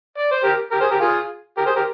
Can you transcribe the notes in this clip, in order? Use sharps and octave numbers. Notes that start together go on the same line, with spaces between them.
D5
C5
G4 A#4
G4 A#4
G#4 C5
G4 A#4
F4 G#4
G4 A#4
G#4 C5
G4 A#4